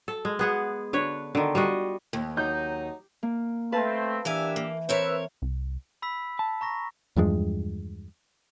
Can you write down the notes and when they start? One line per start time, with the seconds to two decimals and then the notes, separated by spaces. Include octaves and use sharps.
0.08 A4
0.25 G#3
0.39 B3 G#4 F#5
0.93 D3 B4 C#5
1.35 D3 D#3
1.55 G3 F4 F#4 D#5
2.13 D#2
2.37 F#3 D#4 G6
3.23 A#3
3.72 A3 C4 B4 F5 A5
4.25 E3 D4 G4 A#4 E5 F5 G#5
4.56 A#3
4.89 C4 A#4 B4 C#5 E5
5.42 C2
6.02 B5 E6 B6
6.39 A5
6.61 A#5 C#6 A#6
7.16 E2 G2 F3 G#3